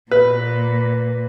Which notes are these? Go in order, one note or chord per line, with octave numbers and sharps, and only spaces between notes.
A#2 B4